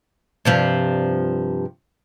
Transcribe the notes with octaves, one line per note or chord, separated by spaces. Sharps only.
G2 C3 F3